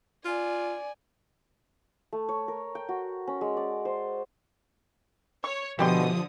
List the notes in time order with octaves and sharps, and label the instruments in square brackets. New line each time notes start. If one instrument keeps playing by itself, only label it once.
[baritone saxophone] F4 [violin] D5 G#5
[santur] A3
C#5
A#4
G5
F#4
C#4
G#3
D5
C5
[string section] C#5 [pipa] C#6
[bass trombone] B2 [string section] D3 D#6 [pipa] E3 G4 C6 [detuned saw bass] F3